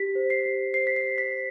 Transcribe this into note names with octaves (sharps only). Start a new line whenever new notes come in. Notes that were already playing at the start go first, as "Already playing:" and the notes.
Already playing: G4 B6
C5
C7
G4
C5 C7
B6
C7
G4
B6
C5